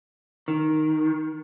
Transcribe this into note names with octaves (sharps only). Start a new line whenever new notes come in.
D#3